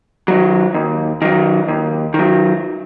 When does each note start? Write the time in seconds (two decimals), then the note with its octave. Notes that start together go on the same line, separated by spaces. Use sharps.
0.28 D#3 F#3
0.74 D#2
1.22 D#3 F#3
1.68 D#2
2.14 D#3 F#3